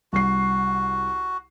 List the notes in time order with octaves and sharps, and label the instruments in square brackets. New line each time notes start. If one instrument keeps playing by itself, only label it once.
[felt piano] C2 C7 [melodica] F#4